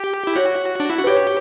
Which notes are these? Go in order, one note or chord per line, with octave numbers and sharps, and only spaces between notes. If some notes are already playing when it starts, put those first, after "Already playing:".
Already playing: G4
E4
F#4 C#5
D4
E4
F#4
B4
G4 C#5